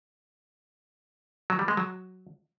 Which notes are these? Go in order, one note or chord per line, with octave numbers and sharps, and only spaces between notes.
F#3
G3
G#3
F#3